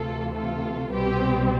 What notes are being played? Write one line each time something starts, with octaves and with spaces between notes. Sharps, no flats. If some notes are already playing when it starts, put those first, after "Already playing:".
Already playing: D2 C3 E3 A3 F4 A4
F4 A4
C2 B2 G3 C4 G4 B4